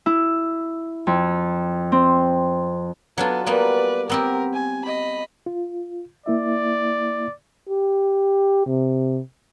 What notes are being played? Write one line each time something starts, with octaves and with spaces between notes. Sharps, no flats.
E4
F2
C4
F#3 B3 D4 F4 A4
G3 A#3 B3 B4 D5
B3 C4 G4 A#4
G#5
D#5 B5
F4
A#3 E4 D5 E5
G4
C3